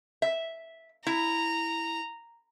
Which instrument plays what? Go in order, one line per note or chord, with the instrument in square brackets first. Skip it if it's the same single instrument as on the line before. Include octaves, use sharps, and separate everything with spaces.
[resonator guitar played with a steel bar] E5
[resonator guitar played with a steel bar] E4 [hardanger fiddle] A#5